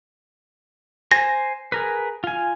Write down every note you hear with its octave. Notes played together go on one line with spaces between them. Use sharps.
C5 G#5 A#6
G#4 A#4 B4
F4 G#5